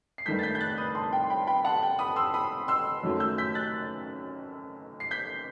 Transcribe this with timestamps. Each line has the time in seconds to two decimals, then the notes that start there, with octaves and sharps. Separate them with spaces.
0.18 C7
0.26 G2 D#3 A3 G6 B6
0.39 A6
0.43 G6 B6
0.55 G6
0.61 F#6 A6
0.78 B5 D#6
0.95 A5 C6
1.13 G5
1.24 C6
1.30 G5 B5
1.47 G5 B5
1.65 F#5 A5
1.83 G5
1.99 B5 D#6
2.16 C6 E6
2.34 B5 D#6
2.68 C6 E6
3.03 F#2 D#3 F#3 A3
3.20 E6 G6
3.38 G6 B6
3.55 F#6 A6
5.00 C7
5.11 G6 B6